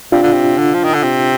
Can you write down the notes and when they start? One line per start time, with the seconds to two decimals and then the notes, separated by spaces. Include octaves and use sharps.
0.12 C3 D4 F4
0.23 D3
0.32 C3
0.58 D3
0.74 F3
0.84 D#3
0.94 D3
1.03 C3